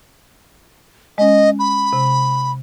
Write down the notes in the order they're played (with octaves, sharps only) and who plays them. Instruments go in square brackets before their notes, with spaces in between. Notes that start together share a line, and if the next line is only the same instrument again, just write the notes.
[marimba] G#3 C#4 [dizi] D#5
[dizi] B5
[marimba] C3